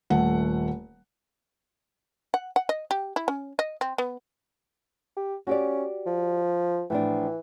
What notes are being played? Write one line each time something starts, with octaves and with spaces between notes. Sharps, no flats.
D#1 A3 F#5
F#5
F#5
D#5
G4
E4
C#4
D#5
C4
B3
G4
C#4 F#4 G4 D5
F3
A2 E3 F3 D4